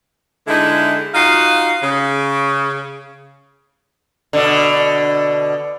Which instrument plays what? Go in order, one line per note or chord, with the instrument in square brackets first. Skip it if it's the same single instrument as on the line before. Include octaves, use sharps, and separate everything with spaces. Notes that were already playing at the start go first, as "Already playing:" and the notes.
[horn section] D3 G#3 D#4 E4
D#4 F4 F#4 F5
C#3
[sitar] B2 D3